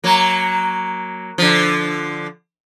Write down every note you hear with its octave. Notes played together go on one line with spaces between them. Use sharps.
F#3 A#3
D3 F3